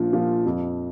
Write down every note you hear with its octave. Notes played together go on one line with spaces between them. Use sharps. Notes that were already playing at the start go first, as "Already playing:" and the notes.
Already playing: A#1 A#2 F3
A#2 F3
F2